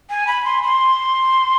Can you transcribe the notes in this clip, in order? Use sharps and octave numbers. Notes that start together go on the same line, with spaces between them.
G#5
B5
C6
C6